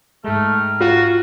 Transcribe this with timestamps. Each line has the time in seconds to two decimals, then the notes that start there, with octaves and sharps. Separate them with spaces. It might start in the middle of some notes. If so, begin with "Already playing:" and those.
0.24 G#2 G#3 A3 G5 A#5 F6
0.81 F4 F#4